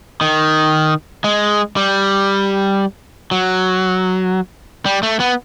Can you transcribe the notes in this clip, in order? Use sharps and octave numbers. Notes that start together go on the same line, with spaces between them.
D#3
G#3
G3
F#3
G3
A3
B3